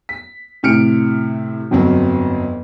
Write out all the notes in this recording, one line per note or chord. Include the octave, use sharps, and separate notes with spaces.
B6
A2 C3 F6 C#7 D7
G1 F2 F#3